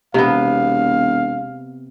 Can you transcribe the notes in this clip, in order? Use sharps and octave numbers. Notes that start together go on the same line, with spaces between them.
E1 C3 B3 F5